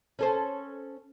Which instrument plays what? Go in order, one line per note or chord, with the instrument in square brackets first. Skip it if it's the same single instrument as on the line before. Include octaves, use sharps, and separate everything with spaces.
[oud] C#4 A4 C5